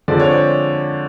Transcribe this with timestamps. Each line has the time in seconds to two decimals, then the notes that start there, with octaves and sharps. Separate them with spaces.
0.08 D3 F3 G#3 C4 D5
0.19 C#5
0.31 C5 D5